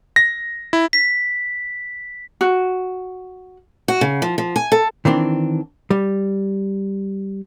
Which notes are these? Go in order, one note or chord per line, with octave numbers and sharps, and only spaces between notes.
A#6
E4
B6
F#4
F#4
C#3
F3
F3
G#5
A4
D#3 E3 C4 D4
G3